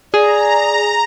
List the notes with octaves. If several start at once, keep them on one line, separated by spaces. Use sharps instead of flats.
G#4 D5 A#5